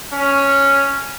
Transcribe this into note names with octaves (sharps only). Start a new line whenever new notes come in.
C#4